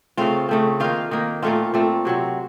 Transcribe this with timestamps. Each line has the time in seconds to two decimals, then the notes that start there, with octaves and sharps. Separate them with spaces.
0.17 C#3 A3 C4 F4 F5
0.49 C#3 A3 C4
0.80 D#3 A#3 F4 F5
1.11 D#3 A#3
1.42 A#2 A3 C4 F4 F5
1.74 A#2 A3 C4
2.05 C3 F#3 C4